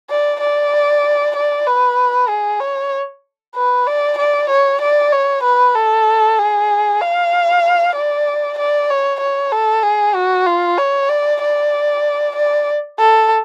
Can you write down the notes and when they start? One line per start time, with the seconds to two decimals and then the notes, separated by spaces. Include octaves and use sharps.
0.10 D5
0.41 D5
1.36 D5
1.67 B4
2.29 G#4
2.60 C#5
3.55 B4
3.87 D5
4.18 D5
4.49 C#5
4.81 D5
5.12 C#5
5.43 B4
5.75 A4
6.38 G#4
7.00 F5
7.95 D5
8.58 D5
8.90 C#5
9.20 C#5
9.52 A4
9.83 G#4
10.14 F#4
10.46 F4
10.78 C#5
11.09 D5
11.41 D5
12.36 D5
12.98 A4